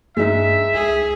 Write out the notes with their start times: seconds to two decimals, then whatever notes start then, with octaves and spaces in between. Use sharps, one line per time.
0.17 G2 G#3 D#4 E5
0.73 C#2 G#4